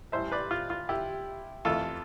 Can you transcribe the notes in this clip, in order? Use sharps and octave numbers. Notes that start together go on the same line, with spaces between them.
A1 A2 G3 C5 E5
B4 D5
F4
F4
E4 G4
F2 E3 A3 F4 A4